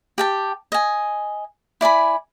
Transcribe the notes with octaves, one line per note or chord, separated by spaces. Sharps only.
G4 G5 A5
D#5 G#5
E4 D5 G#5 B5